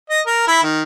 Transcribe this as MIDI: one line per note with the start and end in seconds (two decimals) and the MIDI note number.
0.10 0.20 75
0.27 0.44 70
0.47 0.60 64
0.63 0.83 51